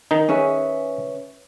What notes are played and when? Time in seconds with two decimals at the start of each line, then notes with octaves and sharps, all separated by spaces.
0.11 D#3 D#4
0.28 C#4 G#4 B4 E5